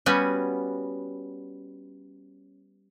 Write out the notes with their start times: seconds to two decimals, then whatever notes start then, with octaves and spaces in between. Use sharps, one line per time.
0.06 G3 B3 C#4 F#4 G#5